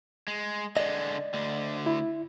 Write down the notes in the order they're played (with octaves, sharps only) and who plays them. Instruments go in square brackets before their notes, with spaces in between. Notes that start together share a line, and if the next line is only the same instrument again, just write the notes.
[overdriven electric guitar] G#3
[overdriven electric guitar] D3 G#3 [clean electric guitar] D5 D#5
[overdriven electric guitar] D2 D3
[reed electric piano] E4